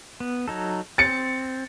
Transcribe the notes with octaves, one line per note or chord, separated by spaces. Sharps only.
B3
F#3 D#4 A4
C4 A6 C#7